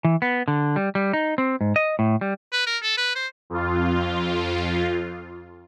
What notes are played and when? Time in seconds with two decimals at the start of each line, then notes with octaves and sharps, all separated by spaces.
0.05 E3
0.22 B3
0.48 D3
0.76 G3
0.95 G3
1.13 D#4
1.38 C4
1.61 G#2
1.76 D#5
1.99 A2
2.21 G3
2.53 B4
2.67 A#4
2.83 A4
2.97 B4
3.15 C5
3.50 F2 F4